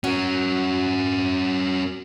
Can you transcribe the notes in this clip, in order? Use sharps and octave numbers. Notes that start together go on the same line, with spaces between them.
C#4 F#4 A#4